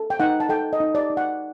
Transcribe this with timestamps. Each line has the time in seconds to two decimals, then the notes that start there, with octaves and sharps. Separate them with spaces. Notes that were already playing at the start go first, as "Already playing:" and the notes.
Already playing: A4
0.10 G5
0.20 D#4 F#5
0.40 A5
0.49 A4 G5
0.73 D#5
0.80 D#4
0.95 D5
1.10 D#4
1.17 F#5